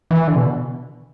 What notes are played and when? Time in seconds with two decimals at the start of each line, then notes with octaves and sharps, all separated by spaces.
0.11 E3
0.27 D3
0.35 B2